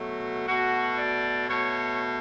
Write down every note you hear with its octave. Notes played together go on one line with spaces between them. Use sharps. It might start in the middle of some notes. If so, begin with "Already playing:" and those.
Already playing: B2 F#3 A3
B2 A3 F#4
D5
B2 A3 C#5